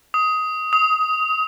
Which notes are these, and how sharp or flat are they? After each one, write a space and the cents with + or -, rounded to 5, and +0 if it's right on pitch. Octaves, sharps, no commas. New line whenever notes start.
D#6 +15
D#6 +30